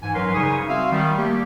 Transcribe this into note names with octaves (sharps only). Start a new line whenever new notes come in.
G#2 E3 G#5
F#2 F#3 A#4 B4 C6
C#3 G3 D#4 G#5 C#6 D#6
C4 F#4 E5 F5
D#3 G3
A3 A#3 G4